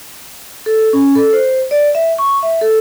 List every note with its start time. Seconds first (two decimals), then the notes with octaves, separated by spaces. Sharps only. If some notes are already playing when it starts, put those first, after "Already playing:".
0.66 A4
0.93 C#4
1.15 A4
1.33 C5
1.71 D5
1.95 E5
2.19 C#6
2.43 E5
2.61 A4